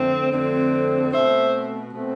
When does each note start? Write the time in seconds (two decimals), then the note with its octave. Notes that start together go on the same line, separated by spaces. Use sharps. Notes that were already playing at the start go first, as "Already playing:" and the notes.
Already playing: F2 D3 A3 C4
0.31 F2 D3 A3 C4
1.11 B2 A3 C4 C5 E5
1.92 B2 A3 C4